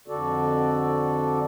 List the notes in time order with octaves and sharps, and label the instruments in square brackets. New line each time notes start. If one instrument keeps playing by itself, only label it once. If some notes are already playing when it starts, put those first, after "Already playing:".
[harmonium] F2 D3 F#4 A4 D5